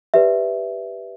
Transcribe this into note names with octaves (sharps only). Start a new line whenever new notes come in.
G4 B4 D5 E5